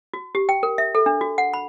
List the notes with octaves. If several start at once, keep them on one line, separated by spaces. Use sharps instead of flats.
F#4
G4
G5
A#4
E5
A4
D4
F#4
F#5
B5